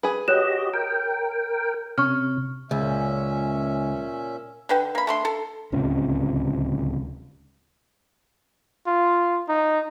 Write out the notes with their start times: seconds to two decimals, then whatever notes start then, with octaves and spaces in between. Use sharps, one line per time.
0.03 G#4 B4
0.28 F#4 G4 C#5 D#5 F#6 E7
0.74 A#4 G5
1.98 C3 C#4 C#6 F6
2.71 C#2 A#2 C#4 E5
4.69 D3 B4 G5
4.95 A#3 B5
5.07 A3 D4 C6
5.25 A4
5.72 D1 C#2 C3 C#4
8.87 F4
9.49 D#4